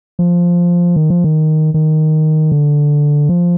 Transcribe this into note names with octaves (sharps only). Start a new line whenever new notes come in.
F3
D#3
F3
D#3
D#3
D3
F3